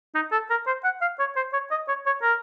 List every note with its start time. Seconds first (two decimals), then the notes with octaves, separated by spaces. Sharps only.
0.15 D#4
0.32 A4
0.50 A#4
0.67 C5
0.84 F#5
1.01 F5
1.19 C#5
1.36 C5
1.53 C#5
1.71 D#5
1.88 C#5
2.06 C#5
2.23 A#4